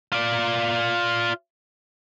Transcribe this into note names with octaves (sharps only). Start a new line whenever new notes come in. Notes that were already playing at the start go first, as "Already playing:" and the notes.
F4 D5